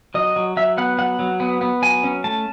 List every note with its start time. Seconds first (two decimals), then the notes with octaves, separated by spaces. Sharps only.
0.14 F#3 D#5
0.36 F#3
0.57 F#3 E5
0.78 B3 F#5
0.98 F#3 F#5
1.19 F#3
1.40 B3
1.61 B3
1.82 F#3 G#5
2.04 C#4
2.24 A3 A5